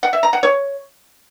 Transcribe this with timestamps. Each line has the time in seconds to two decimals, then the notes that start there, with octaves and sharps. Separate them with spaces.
0.03 F#5
0.13 E5
0.23 A#5
0.33 F#5
0.43 C#5